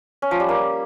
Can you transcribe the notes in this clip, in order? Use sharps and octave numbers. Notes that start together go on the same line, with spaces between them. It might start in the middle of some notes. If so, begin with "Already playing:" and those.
C#4
F3
G3
A#3